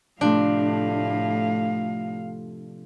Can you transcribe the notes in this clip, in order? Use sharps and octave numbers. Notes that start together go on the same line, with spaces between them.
A2 C3 F3 A3 D4 F5